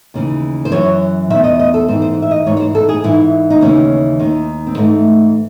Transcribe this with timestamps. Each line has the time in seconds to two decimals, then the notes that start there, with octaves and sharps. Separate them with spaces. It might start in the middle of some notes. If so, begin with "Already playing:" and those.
0.14 D#2 C#3 E3
0.65 C5
0.72 F#2 E3 C#5
1.30 D#3 E5
1.34 E2
1.44 D#5
1.59 D#5
1.74 A4
1.88 G#2 E3 C5
2.02 C5
2.22 E5
2.31 D#5
2.46 G#2 E3 C#5
2.57 C#5
2.60 C5
2.75 A4
2.89 G#4
3.04 G#2 E3 E4
3.50 D#4
3.61 D#2 C#3 E3 C#4
4.20 D#2 D#3
4.67 C4
4.77 G#2 E3 A3